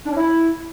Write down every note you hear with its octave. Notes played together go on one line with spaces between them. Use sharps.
D4
C#4
E4